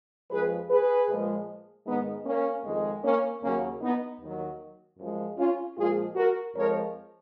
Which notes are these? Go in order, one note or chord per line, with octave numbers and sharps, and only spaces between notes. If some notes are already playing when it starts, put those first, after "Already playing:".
F2 F3 G#3 G#4 B4
G#4 B4
A#2 F3 G#3
G#2 D#3 G#3 B3 D#4
A#3 C#4
F2 D#3 G#3
A#3 C#4
D#2 C#3 F#3 A#3 C#4
B3 D#4
D#2 D#3 F#3
F#2 F3 G#3
C#4 F4
A#2 F3 G#3 F4 G#4
F#4 A#4
F2 F3 G#3 A#4 C#5